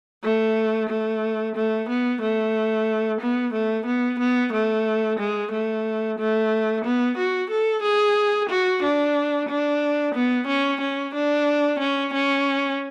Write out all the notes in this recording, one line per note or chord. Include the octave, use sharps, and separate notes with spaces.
A3
A3
A3
B3
A3
B3
A3
B3
B3
A3
G#3
A3
A3
B3
F#4
A4
G#4
F#4
D4
D4
B3
C#4
C#4
D4
C#4
C#4